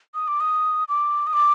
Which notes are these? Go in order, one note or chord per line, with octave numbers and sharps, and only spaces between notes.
D#6
D6
D#6
D6
D#6
D6